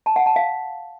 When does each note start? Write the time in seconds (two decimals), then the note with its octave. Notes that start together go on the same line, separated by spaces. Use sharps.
0.06 A5
0.16 F#5
0.26 A5
0.36 F5